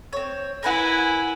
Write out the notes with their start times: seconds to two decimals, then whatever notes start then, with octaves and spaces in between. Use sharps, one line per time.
0.13 C4 C#5
0.63 E4 A#4 B4 F#5 G#5